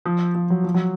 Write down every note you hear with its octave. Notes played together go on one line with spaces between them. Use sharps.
F3
F3
F#3
F3
F#3